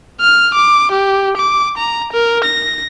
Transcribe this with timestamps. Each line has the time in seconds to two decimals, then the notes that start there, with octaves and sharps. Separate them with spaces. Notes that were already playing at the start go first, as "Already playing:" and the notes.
0.21 F6
0.54 D6
0.92 G4
1.37 D6
1.77 A#5
2.13 A#4
2.44 A#6